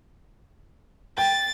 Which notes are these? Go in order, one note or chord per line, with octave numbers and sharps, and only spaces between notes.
G5 A6